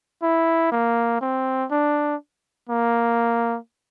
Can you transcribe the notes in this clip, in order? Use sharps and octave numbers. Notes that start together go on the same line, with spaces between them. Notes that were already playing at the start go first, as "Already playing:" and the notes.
E4
A#3
C4
D4
A#3